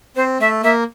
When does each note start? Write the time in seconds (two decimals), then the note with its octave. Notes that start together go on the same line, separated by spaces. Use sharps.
0.16 C4 C5
0.40 A3 E5
0.63 A#3 E5